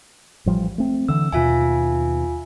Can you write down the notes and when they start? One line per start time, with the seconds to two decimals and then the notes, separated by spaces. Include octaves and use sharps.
0.46 A1 F3 G3
0.78 A3 C4
1.08 D3 E3 E6
1.32 D#2 B2 F4 E5 G#5